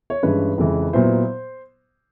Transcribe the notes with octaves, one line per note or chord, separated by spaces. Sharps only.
C#5
G2 E3 G#3 C#4 B4
F2 C#3 E3 G#3
A#2 F#3 B3 E4 C5